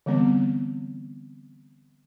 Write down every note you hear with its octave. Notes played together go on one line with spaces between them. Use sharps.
D3 E3 G3 B3 C4